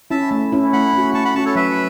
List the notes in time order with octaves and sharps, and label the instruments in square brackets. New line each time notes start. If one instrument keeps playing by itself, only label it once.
[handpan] C#4 E4 [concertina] E5 A5
[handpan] A3
C#4 E4
[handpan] A3 [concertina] F#5 B5
[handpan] C#4 F#4
[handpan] A3 [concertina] A5 C#6
[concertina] F#5 B5
[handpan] C#4 F#4 [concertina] A5 C#6
[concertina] A4 C#5
[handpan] F#3 [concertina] B4 E5